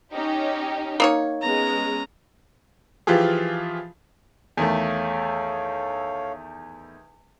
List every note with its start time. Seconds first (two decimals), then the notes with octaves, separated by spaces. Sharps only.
0.13 C#4 D#4 G4
1.00 A#3 D#4 C#5
1.42 G#3 B3 C#4 A#5
3.07 E3 F3 F4 G4 G#4
4.57 E2 D#3 A3 A4 C#5 F5